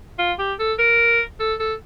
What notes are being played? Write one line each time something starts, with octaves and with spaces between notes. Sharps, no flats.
F4
G4
A4
A#4
A4
A4